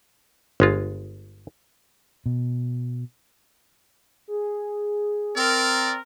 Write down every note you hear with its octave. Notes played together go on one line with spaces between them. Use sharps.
G1 G#3 F4
B2
G#4
C4 A#4 D5